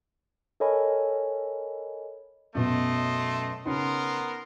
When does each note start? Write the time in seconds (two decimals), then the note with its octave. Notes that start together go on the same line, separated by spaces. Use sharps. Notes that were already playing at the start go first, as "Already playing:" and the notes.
0.60 A4 A#4 C#5 D#5 G#5 B5
2.55 F#2 B2 A3 B3 D#5 C6
3.65 C#3 B3 C#4 D#4 A#4 C6